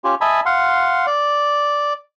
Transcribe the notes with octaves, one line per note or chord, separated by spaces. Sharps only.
C#4 F4 G4
D#5 E5 G#5 A5 B5
F5 F#5 C6
D5